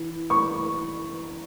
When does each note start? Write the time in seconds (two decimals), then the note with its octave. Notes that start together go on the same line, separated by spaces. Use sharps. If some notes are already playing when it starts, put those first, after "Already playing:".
Already playing: E3
0.30 C#6